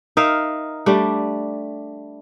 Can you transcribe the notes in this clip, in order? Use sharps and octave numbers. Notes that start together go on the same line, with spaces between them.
D#4 A#4 E5 F5
G3 A3 D4